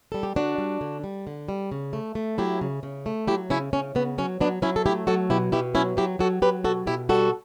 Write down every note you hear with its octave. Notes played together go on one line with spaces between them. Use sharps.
G3 A4
G4
D3 D4 F#4
G3
D3
G3
D3
G3
C#3
A3
A3
F#3 E4 G4
C#3
C#3
A3
F#3 E4 G4
C#3 C#4 E4
C#3 C#4
C#3 B3
F#3 C#4
F#3 B3 D4
F#3 C#4 E4
A4
A3 E4 G4
F#3 F#4 A4
B2 E4 G4
B2 E4 G4
F#3 C#4 E4
F#3 E4 G4
F#3 F#4 A4
F#3 G4 B4
B2 F#4 A4
B2 E4 G4
G3 F#4 A4